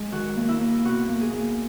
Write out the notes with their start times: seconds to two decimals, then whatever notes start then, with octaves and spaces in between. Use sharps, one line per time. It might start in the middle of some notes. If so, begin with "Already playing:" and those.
Already playing: G#3 D#5
0.12 D#3 F#4
0.36 A#3
0.48 E4
0.60 A#3
0.84 B2 F#4
1.09 A#3
1.21 G#4
1.33 A#3